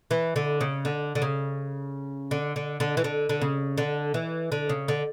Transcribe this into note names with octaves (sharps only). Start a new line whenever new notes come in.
E3
D3
C#3
D3
D3
C#3
D3
D3
D3
E3
D3
D3
C#3
D3
E3
D3
C#3
D3